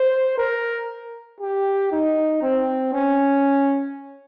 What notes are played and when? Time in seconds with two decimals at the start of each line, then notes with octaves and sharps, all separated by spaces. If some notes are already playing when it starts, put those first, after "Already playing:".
Already playing: C5
0.37 A#4
1.41 G4
1.92 D#4
2.42 C4
2.93 C#4